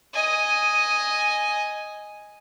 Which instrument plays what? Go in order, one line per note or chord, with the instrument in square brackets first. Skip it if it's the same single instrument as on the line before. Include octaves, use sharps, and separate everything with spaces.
[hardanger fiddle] D#5 G#5